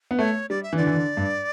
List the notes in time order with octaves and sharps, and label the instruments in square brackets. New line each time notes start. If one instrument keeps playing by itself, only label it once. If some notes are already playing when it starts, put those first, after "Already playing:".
[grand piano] B3
[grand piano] A3 [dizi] C#5
[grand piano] G3 [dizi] D5
[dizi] E5
[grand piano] E3
[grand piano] D3 [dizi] D5
[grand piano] E3
D3
G2